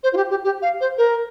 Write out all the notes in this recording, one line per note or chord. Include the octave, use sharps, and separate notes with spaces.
C5
F4
G4
G4
G4
F5
C5
A#4